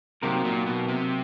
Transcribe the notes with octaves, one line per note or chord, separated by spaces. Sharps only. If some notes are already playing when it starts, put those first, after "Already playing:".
C3 F#3 A#3 D#4 G4 A#4
A#2
B2
C3